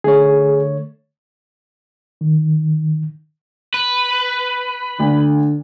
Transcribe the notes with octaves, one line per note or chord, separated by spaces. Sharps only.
D3 A3 G#4 C#5
D#3
B4
D2 D3